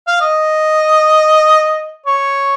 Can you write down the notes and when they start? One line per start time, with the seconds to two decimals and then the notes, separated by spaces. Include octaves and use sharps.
0.07 F5
0.21 D#5
2.06 C#5